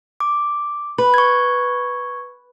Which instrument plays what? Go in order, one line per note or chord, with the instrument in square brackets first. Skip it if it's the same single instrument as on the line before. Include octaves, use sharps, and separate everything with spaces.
[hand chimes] D6
[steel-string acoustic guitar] B4
[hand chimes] C#6 G#6